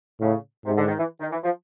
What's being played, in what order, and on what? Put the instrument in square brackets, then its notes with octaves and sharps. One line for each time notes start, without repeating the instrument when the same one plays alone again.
[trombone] A2 [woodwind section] C#3
[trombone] G#2 [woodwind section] C3
[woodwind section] D3
D#3
E3
D#3
E3
F3